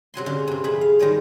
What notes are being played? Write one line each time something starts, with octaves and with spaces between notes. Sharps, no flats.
C3 F#3 G#5 C6
D3 C#4 C5 F5
G2 C3
F2 A3 G#4 B5
F5
D#3 G3 G#3 C#5